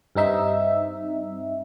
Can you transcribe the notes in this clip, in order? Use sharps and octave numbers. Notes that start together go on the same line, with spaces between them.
G2 C4 D#4 E5